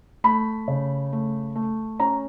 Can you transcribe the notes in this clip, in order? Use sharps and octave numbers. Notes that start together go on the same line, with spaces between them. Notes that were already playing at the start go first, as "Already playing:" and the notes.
A3 B5
C#3
A3
A3
C#4 A#5